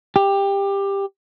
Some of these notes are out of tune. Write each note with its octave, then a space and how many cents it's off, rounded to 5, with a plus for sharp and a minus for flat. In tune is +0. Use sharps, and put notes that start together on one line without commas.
G4 +15